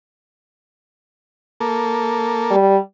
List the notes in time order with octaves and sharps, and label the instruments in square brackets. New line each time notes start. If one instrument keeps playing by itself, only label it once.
[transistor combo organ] A#3 A4
[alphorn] G3